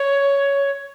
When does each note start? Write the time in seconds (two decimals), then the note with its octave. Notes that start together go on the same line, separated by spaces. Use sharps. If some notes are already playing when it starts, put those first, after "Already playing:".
Already playing: C#5